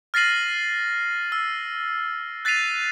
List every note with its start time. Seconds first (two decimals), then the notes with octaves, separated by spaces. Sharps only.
0.14 F6 A6 A#6 C7 D#7 F#7
1.32 E6
2.45 F#6 A6 B6 C7 D#7 F7